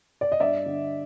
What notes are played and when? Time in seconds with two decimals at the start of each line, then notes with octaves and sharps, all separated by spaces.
0.21 D5
0.32 D#5
0.40 G2 D5 E5
0.66 D3